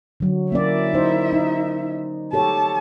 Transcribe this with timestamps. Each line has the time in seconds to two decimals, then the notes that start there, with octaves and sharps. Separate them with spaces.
0.20 D3 F#3
0.52 A#3 C#4 E4 D5 E5
0.94 D#4 C5
1.33 D#4
2.33 G4 A4 C#5 A5